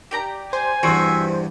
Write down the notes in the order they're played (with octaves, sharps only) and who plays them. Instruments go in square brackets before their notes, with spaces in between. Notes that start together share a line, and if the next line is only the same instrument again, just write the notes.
[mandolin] G4 D5 A#5
[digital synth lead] C5 [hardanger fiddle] G#5
[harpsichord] E2 G2 [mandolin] C4 F#4 E5